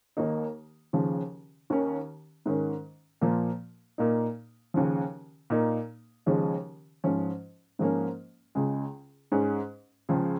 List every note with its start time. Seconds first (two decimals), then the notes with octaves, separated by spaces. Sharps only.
0.17 D#2 D#3 A#3 D#4
0.93 D#2 C#3 F3
1.70 D#2 D#3 C#4
2.46 G#2 D#3 C#4
3.21 A#2 F3 A#3
3.98 A#2 A#3 D#4
4.74 D#2 C#3 F3
5.50 A#2 A#3 D#4
6.26 D#2 C#3 F3 G#3
7.04 G#2 F3 C#4
7.79 G#2 F3 A#3 C#4
8.55 C#2 C#3 G#3
9.32 G#2 G#3 C#4
10.09 C#2 C#3 F3